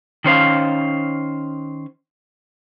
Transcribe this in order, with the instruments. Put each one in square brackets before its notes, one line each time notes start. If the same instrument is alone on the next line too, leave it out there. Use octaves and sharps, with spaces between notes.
[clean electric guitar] D#3 C#4 C5 F5